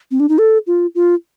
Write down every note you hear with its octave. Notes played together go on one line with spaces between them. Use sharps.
C4
D4
D#4
A4
F4
F4